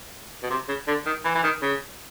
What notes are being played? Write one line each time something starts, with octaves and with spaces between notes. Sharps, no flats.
B2
C3
C#3
D3
D#3
E3
E3
D#3
C#3